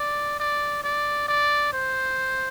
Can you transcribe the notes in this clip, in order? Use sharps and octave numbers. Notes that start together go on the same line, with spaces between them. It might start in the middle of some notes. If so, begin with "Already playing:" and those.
Already playing: D5
D5
D5
D5
C5